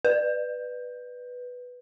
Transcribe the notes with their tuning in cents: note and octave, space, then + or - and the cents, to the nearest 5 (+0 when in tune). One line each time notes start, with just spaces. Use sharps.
B4 +0